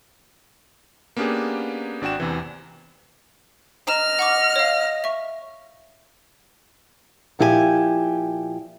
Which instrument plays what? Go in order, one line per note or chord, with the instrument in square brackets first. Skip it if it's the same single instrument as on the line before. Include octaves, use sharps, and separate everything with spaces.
[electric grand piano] A#3 B3 C#4 D4 G4 G#4
G#1 D4 F#4 G5 E7
E2 C3 E3
[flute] D#5 [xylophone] A#5 E7 [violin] F6
[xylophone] F#5 C#6 D6
C#5 F5
E5 C#6
[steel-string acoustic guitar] A#2 F3 E4 G4 B4 G#5